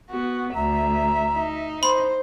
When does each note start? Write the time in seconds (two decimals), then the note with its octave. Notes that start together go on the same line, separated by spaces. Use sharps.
0.11 B3 F#4
0.55 D2 E5 A#5
1.37 D#4
1.83 C5 B5 C6